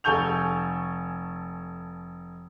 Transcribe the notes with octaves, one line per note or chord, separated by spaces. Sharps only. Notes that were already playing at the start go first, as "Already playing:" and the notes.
F1 A4 G#5 C#6 G6 F7